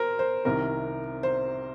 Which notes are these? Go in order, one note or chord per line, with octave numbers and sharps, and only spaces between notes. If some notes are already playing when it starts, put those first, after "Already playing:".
Already playing: A#4 C5
C5
C2 C3 D#3 A#4
C5